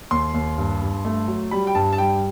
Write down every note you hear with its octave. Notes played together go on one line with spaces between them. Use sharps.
D#2 C6
D#2
G2
G2
A3
F#3
G3 B5
G5
G2 A5
A5
G3 G5